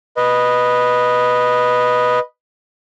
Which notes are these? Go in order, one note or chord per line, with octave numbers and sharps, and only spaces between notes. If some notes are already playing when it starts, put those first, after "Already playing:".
B4 D#5